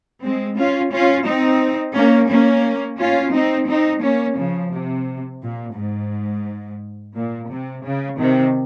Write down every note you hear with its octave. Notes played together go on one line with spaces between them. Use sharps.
G#3 C4
C#4 F4
C#4 F4
C4 D#4
A#3 C#4
A#3 C#4
C#4 F4
C4 D#4
C4 D#4
A#3 C#4
C#3 F3
C3
A#2
G#2
A#2
C3
C#3
C3 D#3